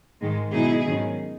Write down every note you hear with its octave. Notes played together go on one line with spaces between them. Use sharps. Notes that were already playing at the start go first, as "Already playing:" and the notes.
G#2 D#3 G#3
B2 F#3 B3 D#4 E4 G#4
G#2 D#3 F#3 C#4